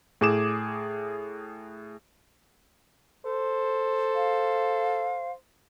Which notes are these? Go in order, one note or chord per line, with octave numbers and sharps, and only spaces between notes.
A2 G#4 D6 E7
A4 C5
F5